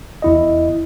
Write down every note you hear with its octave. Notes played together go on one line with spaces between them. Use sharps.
E2 E4 D#5